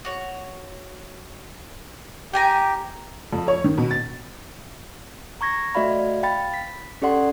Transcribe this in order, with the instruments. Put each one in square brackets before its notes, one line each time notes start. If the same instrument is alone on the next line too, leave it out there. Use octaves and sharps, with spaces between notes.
[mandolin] F#4 C#5
[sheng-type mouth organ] G4 [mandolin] G5 G#5 A#5
[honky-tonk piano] F2
C#5
D#3
B2
A6
[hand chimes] A#5 C#6 G#6 A#6
A3 F#4 D5 E5 F5 B5
F5 G5 B5 A6
B6
C#4 G4 A4 D5 F#5 C6